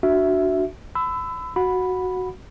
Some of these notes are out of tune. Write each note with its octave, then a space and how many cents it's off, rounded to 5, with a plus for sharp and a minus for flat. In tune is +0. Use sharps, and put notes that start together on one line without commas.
D4 +10 F#4 +0 E5 +0
B5 +35 E6 +0
F#4 +0 F#5 -20 B5 +0